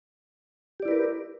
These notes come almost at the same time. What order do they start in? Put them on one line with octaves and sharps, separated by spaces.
G4 D5 E4 B4 A#4